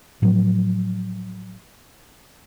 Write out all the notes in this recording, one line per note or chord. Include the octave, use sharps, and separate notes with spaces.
A2 F3 F#3